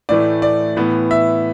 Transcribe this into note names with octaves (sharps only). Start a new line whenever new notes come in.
A2 E3 A3 D5
D5
A2 E3 B3
E5